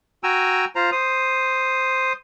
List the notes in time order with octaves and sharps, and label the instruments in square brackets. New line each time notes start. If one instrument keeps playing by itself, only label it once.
[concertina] F#4 G5 G#5 A#5 E6
F4 C5 A#5
C5 D#6